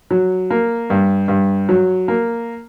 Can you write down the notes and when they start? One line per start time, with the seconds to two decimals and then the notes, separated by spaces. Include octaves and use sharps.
0.11 F#3
0.50 A#3
0.90 G2
1.28 G2
1.69 F#3
2.08 A#3